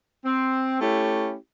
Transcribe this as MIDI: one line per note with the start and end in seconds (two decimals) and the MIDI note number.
0.24 0.77 60
0.81 1.35 57
0.81 1.35 61
0.81 1.35 64
0.81 1.35 67